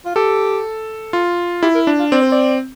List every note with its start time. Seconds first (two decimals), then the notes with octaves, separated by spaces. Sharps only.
0.06 F4
0.16 G4 A4
1.13 F4
1.63 E4 G4
1.75 A#4
1.87 D4
1.99 F4
2.11 C4 D5
2.22 C5
2.32 D5